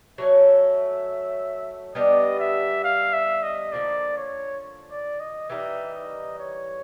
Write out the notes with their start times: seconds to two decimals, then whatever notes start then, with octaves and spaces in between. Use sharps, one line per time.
0.18 F#3 A3 C#4 E5
1.95 G3 B3 D4 G4 D#5
2.39 E5
2.84 F5
3.13 E5
3.43 D#5
3.72 D3 F3 A#3 D5
4.17 C#5
4.91 D5
5.20 D#5
5.50 E3 G3 A#3 D#4 E5
5.94 D#5
6.39 C#5